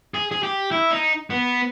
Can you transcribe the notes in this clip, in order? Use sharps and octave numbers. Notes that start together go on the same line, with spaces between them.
G#4
G#4
G4
E4
D#4
B3